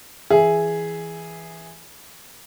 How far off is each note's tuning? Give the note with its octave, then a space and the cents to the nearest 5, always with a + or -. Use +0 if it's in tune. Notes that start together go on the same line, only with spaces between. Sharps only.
E3 +0 G#4 +0 E5 +0